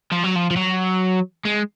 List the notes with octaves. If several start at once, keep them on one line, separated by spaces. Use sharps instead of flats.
F3
F#3
F3
F3
F#3
G#3